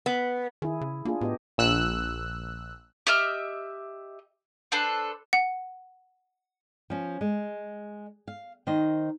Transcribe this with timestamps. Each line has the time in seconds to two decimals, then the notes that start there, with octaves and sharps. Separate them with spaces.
0.06 B3
0.62 D#3 E4 G#4
0.81 C#3
1.05 A#3 D4 F4 G#4
1.21 A2 B3 G4 D#5
1.58 A#1 E6 F#6
3.07 G4 D#5 E5 F6
4.72 D4 A4 B4 C5
5.33 F#5
6.90 F3 C#4
7.21 G#3
8.28 F5
8.67 D#3 C5 D#5